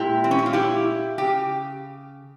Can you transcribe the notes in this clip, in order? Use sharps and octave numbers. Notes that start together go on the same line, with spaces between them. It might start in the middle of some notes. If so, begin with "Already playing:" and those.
Already playing: A#2 G#3 E4 G4
C4
C#4
E4
F4
E4 G4
C#3 G4